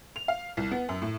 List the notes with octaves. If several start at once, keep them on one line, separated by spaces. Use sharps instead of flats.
F7
F5
C2
B3
F#2
A2